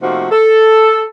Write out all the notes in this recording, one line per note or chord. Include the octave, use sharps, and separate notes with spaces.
C3 F3 A3 A#3 D#4 F#4
A4